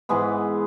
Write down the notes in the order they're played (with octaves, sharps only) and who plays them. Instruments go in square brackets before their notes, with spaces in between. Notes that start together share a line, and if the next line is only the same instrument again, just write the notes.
[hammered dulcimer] G#2 E3 G#3 B3